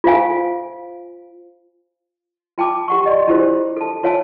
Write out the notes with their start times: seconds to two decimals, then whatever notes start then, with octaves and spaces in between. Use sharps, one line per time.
0.04 F4 C5 F5 G#5
2.58 F4 G5 A5 D6
2.88 G4 F#5 C#6
3.06 F#4 D5 D#5
3.27 D4 E4 F4 G4 G#4 C5
3.77 A4 A5
4.03 F4 C#5 F5 G#5 A5